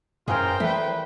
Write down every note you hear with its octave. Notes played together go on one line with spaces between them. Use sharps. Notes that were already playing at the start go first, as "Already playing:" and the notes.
A1 F#2 F4 G#4 A#4 C5 G5
C2 A#2 E3 A3 B4